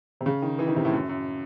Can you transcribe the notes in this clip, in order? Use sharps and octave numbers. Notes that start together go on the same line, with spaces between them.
C3
C#3
D#3
E3
D#3
C3
A2
F#2
F#2